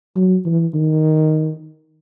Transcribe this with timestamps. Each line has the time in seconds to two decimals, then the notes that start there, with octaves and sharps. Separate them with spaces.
0.16 F#3
0.45 E3
0.74 D#3